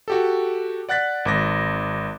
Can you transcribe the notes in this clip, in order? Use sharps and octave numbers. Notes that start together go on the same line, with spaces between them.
F#4 G4 A4
D5 F#5 F#6 A6 B6
G#1 D6 A#6